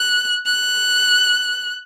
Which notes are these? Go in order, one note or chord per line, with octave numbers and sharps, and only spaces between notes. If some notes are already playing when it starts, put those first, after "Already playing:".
Already playing: F#6
F#6